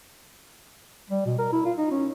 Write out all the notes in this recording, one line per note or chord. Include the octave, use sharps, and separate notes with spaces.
G3
B2
A#4
E4
F4
D#4
C#4